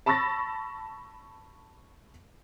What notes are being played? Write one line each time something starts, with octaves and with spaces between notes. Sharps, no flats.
A5 B5 C#6 E6 A6 A#6